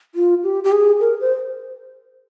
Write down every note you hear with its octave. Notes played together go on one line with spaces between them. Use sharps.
F4
G4
G4
G#4
A#4
C5